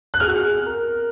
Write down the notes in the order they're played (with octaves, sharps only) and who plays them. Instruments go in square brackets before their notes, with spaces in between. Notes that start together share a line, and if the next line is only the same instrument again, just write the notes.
[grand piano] F#6
[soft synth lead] G#4 [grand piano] F6
[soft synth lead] F#4
G#4
A#4